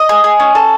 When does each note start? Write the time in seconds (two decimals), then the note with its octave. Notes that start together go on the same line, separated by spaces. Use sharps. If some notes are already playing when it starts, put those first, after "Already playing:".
Already playing: D#5
0.09 G#4
0.24 G#4
0.40 C#4
0.55 A4